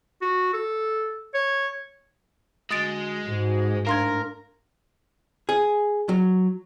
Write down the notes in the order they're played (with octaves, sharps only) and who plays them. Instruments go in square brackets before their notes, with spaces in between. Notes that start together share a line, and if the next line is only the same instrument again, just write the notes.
[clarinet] F#4
A4
C#5
[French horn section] D3 F#4 [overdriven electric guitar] G#3 [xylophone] D#6 A6 D7
[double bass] G#2 [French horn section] F#4
[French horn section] A2 D4 [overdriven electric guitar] A#4 [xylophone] F5 C6 G#6
[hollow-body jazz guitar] G#4
F#3